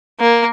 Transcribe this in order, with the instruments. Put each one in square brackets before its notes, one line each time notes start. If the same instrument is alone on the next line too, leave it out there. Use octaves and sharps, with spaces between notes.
[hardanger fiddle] A#3